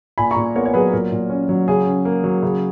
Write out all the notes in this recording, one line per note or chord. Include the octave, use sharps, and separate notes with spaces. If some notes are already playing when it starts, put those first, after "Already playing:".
A#2 G#5 B5
A#5 C#6
A#2
B3 A#4 C#5
C#5
F#3 G#4 B4
A#2 A#4
A#2
C#4
F#3
C#3 G#4
C#4
A#3
F#3
C#3